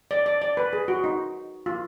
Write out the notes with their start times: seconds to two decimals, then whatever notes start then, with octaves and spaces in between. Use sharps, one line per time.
0.11 D5
0.26 D5
0.42 D5
0.57 B4
0.73 G#4
0.88 F#4
1.04 D#4
1.66 F4